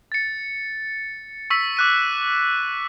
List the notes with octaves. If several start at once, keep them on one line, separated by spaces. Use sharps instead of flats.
A6 C#7
C#6 E6 B6
D6 F#6 D#7